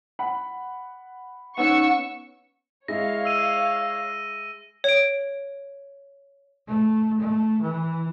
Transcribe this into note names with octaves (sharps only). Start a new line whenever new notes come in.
F#5 B5
B3 C#4 D#4 F#5 C#6 E6 C#7
G#3 E4 C#5 D#5 F5 A#6
E6 D#7
C#5 D7
A3
A3
E3